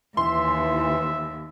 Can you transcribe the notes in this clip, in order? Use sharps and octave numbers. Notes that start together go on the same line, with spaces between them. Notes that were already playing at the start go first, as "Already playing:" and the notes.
D#2 E3 E5 C6